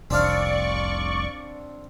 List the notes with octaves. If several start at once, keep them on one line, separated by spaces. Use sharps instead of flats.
F1 C2 C4 D4 D5 F5 C#6